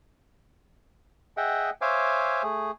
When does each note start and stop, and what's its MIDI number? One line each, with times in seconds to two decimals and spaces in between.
1.37 1.70 68
1.37 1.70 75
1.37 1.70 76
1.37 1.70 78
1.37 1.70 79
1.81 2.43 72
1.81 2.43 73
1.81 2.43 76
1.81 2.43 77
1.81 2.43 80
1.81 2.43 86
2.43 2.71 57
2.43 2.71 68